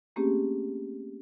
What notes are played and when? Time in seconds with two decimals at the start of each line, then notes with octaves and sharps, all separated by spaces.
0.16 A3 A#3 C4 C#4 G4 G#4